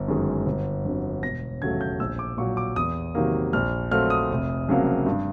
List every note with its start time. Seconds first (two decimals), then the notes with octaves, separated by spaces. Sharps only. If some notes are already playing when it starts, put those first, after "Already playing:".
Already playing: G1
0.08 F#2 D#3 G#3
0.46 G1
0.84 F2 D3 F#3
1.23 E1 A#6
1.62 D#2 C#3 F#3 A3 G#6
1.81 G6
2.00 A#1 E6
2.19 D6
2.38 A#2 F#3 C#6
2.57 D6
2.76 E2 D#6
3.15 C3 D#3 F#3 A#3
3.53 A#1 F6
3.91 A#2 F#3 A3 C4 F6
4.10 D#6
4.31 F1
4.69 F2 C#3 F#3 A#3
5.06 G2